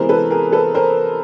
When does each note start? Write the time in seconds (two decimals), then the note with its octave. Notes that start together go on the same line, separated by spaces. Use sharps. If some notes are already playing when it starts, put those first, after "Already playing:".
Already playing: C3 E3 G#3 B3 A#4 C5
0.09 A4 B4
0.31 G#4 A#4
0.52 A4 B4
0.74 A#4 C5